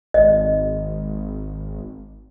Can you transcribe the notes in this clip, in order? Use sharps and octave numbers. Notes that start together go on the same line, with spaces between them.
G#1 D#5